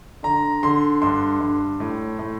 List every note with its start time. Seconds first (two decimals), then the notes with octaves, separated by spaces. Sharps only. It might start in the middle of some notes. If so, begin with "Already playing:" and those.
0.23 D3 A#5
0.63 D3 C6
1.02 G2 C6
1.41 G2
1.80 A2
2.19 A2